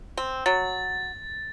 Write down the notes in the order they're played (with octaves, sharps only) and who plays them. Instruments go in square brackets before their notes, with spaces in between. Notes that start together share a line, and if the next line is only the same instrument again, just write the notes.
[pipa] C4
[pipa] F#3 [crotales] A6